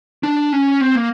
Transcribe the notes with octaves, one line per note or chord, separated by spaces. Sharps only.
D4
C#4
C4
A#3